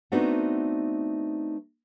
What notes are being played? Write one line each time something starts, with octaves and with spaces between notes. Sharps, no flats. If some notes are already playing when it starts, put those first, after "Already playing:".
A3 B3 C4 D4 D#4 F#4